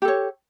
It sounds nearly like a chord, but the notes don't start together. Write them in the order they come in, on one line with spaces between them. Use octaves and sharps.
G4 A4 C#5